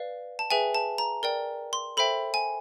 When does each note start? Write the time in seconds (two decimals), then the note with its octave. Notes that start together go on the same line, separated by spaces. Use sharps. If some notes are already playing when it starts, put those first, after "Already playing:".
Already playing: B4 D5 F5
0.39 A5
0.51 G#4 B4 E5 G5 G#5
0.75 A5
0.98 A#5
1.23 A#4 D5 G5
1.73 C6
1.97 A4 C5 E5 G5 B5
2.34 G#5